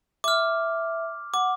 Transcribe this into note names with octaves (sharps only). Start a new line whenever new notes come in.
E5 D6 F6
F#5 D6